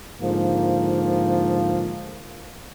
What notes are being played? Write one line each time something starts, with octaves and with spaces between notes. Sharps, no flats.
G#2 D3 F3 A#3